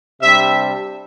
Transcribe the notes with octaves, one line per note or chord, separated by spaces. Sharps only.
C3 G3 D4 E5